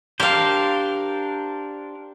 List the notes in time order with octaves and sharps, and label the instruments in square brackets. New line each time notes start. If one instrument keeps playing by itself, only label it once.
[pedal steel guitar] D4 A#4 C5 [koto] G4 F5